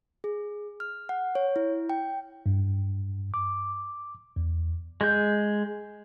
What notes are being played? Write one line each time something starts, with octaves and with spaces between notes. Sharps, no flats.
G#4
F6
F#5
C#5
E4
G5
G2
D6
E2
G#3 G6